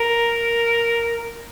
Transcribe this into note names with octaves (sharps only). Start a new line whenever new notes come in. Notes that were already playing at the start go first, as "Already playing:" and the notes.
Already playing: A#4